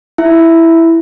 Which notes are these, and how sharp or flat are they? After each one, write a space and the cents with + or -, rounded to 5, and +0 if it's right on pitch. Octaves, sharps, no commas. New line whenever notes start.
E4 +0 E5 +0